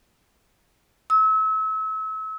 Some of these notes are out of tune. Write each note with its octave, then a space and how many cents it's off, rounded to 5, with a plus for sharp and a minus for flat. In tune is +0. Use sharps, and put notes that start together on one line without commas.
E6 -35